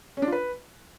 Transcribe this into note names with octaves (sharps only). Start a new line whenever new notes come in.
C#4
D4
F4
B4